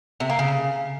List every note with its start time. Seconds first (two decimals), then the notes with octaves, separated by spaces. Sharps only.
0.20 C3
0.30 A#3
0.39 C#3